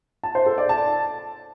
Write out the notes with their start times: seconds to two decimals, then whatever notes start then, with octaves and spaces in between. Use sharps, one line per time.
0.23 A5
0.35 C5
0.46 A4
0.58 D5
0.69 A5